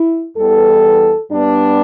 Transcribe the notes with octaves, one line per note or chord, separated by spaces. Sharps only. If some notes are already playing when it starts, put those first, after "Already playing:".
Already playing: E4
E2 E3 G3 B3 A4
G2 G3 B3 D4